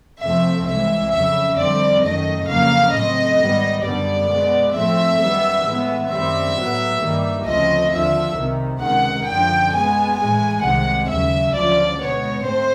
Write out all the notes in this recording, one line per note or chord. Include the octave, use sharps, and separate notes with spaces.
F2 C3 F3 A3 C4 E5
C2 C3 E3 G#3 E5
F2 C#3 F#3 E5
F2 D3 G3 C4 D5
F#2 D#3 F#3 A3 D#5
F2 C#3 F#3 A#3 F5
A2 F#3 A3 C4 D#5
G#2 D#3 G3 B3
F#2 D3 G3 B3 D5
B2 G#3 B3
A2 F3 A3 C4 E5
F#2 D#3 G3 B3
A2 E3 G#3 B3
F#2 D#3 G3 C4 E5
A2 F#3 B3
G2 D#3 G3 A#3
D2 C#3 F3 A3 C4 D#5
D#2 D3 F3 E5
C2 C3 D#3
C#2 C3 D#3 G#3 F#5
F#2 D3 F3 G5
B2 G#3 B3 G#5
A2 E3 G#3 G#5
C2 C3 D#3 G#3 F#5
D#2 C#3 F#3 E5
D2 C#3 F3 D5
B2 G#3 B3 C#5
G#2 A3 C4 C5